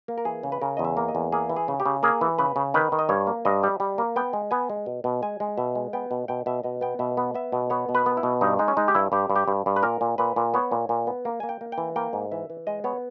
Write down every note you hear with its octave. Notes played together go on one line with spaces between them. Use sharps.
A#3
A#4
E3 G#4
C#3
B4
C#3 A#4
E2 D#5
E5
A#3
D#5
E2
A#3 G#4
E3
G#4
C#3
G4
C#3
A#3 G#4
E3
C#3 B4
C#3
D#3 B4
D#3
D#5
G2 C#5
A#3
G2 D#5
G3
G3
A#3
B3 G5
G#3
B3 G#5
G#3
B2
B2
G#3 G#5
G#3
B2 E5
G#3
B3 G5
B2
B2 G5
B2 E5
B2 D#5
B3 G5
B2 E5
B3
B3 E5
B2
B3 C#5
B2
B4
B3
E4
B2
G2 D#4
G#3 D#4
C#4
G#3 D#4
G4
G2 E4
G2 G4
G2
G4
G2
G2
B4
A#2 A#4
A#2
A#2 B4
A#2
B3 C#5
A#2
A#2
B3
A#3
A#3 G#5
G5
A#3
G5
E3
A#3 G5
G#2
E3 E5
E3
G#3 D#5
B3 C#5